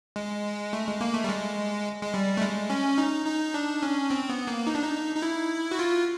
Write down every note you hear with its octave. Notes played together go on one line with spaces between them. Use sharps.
G#3
A3
G#3
A#3
A3
G3
G#3
G#3
G3
A3
G#3
C#4
D#4
D#4
D4
C#4
C4
B3
A#3
D#4
D4
D#4
D#4
E4
F#4
F4